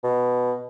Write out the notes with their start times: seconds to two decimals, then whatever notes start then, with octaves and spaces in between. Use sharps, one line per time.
0.04 B2